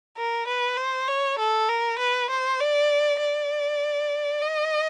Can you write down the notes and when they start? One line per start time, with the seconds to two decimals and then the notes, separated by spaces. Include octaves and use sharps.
0.17 A#4
0.47 B4
0.77 C5
1.08 C#5
1.39 A4
1.69 A#4
1.99 B4
2.30 C5
2.60 D5
3.20 D5
4.42 D#5